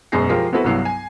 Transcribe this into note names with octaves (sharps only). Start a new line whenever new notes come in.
E1 F#2 B2 G#4 A#6 C7
F3 F4 G4 G#4 A#4
B3 C4 E4 F#4 A4 B4
C2 G2 F#3 B3 E6 C7
G#5